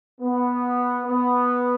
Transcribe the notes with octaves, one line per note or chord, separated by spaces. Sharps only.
B3
B3